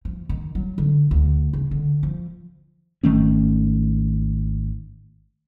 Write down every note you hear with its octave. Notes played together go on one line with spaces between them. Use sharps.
F3
D#3
F#3
D3
D2
C#3
D3
F3
G#1 D#3 A3 C#4